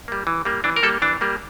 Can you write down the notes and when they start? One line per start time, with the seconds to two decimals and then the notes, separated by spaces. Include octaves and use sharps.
0.08 G3 A#3
0.27 E3
0.45 G3 A#3
0.64 E3 D4
0.76 A#4
0.83 G3 A#3 A4
1.02 E3 D4
1.21 G3 A#3